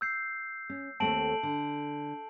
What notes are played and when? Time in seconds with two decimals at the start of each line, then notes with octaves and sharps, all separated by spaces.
0.01 E6 G6 C7
0.70 C#4
1.00 D#2 A3 C4 A5 D7 F#7
1.43 D3